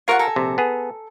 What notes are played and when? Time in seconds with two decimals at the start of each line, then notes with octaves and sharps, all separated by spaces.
0.08 F4 A#4 C#5 D5 F#5
0.19 A4 G#5 A#5
0.36 A#1 C3
0.58 B3 G#4